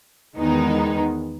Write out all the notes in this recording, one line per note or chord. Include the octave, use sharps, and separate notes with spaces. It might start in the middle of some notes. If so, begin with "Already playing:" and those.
E2 D#3 G#3 B3 D#4